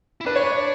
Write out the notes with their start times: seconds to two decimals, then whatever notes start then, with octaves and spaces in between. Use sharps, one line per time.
0.21 E4
0.26 D4 B4
0.36 C#5
0.44 B4
0.52 C#5